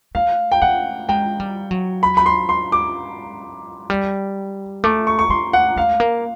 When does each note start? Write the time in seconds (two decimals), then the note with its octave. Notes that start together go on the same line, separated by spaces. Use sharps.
0.15 A3 F5
0.52 G5
0.62 A3 F#5
1.09 G#3 G5
1.40 G3
1.71 F#3
2.03 B5
2.17 B5
2.26 C6
2.49 C6
2.72 D6
3.90 G3
4.84 A3 D6
5.07 C#6
5.19 C#6
5.30 A3 C6
5.53 F#5
5.76 A3 F5
6.00 A#3